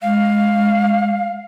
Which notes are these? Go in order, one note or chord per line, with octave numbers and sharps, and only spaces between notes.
G#3 F5